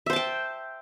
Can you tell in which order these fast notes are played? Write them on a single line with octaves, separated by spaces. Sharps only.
E5 C5 A5 G5